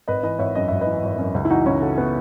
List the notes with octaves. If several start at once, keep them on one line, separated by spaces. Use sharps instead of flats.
G#1 B4 D#5
E3 B4 D#5
G#1 C#5 E5
F#2 D#5
G#1 E5
B4 D#5
E3
G#1
F#2
C#2
E4
E3 D#4 F#4
C#2 C#4 E4
C#3 F#4 A4
B3